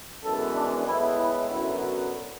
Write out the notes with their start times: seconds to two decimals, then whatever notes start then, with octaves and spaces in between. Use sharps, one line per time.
0.23 F#2 E3 G#3 B3 A4
0.55 D4
0.85 A2 G#3 B3 E4
1.17 E4
1.49 F#2 D3 F#3 B3 E4